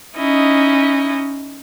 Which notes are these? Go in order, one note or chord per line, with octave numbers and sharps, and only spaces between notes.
C#4 D#4 E4 D#5